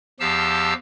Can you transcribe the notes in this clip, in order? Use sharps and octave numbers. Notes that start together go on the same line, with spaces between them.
E2 F3 G4 F5 A5 E6